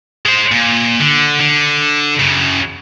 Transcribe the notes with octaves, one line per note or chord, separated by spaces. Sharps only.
G#3 C5
A#2
D3
D3
F#2 C#3